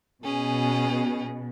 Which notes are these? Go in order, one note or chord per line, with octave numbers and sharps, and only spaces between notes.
B2 C#4 G#4